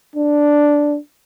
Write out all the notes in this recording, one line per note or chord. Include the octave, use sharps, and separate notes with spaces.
D4